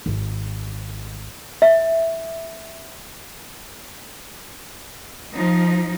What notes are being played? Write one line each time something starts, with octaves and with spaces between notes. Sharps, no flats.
G#1
E5
F3 D#4